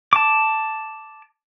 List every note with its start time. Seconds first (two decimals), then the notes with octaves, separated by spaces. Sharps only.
0.13 A5 D6